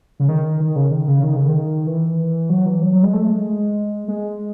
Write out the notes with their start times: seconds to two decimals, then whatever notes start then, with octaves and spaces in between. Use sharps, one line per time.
0.20 C#3
0.29 D#3
0.60 D#3
0.76 C#3
0.91 D#3
1.08 C#3
1.23 D#3
1.36 C#3
1.49 D#3
1.87 E3
2.50 F#3
2.66 E3
2.82 F#3
2.92 F#3
3.03 G#3
3.13 A3
3.29 G#3
4.08 G#3